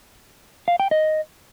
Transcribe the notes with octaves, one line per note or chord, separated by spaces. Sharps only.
F5
G5
D#5